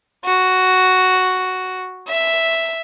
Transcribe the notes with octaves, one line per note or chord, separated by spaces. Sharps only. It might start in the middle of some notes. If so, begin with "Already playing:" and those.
F#4
E5